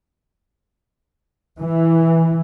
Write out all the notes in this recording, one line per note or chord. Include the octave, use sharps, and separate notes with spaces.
E3